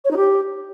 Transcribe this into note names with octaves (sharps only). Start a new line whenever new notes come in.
C#5
D#4
G4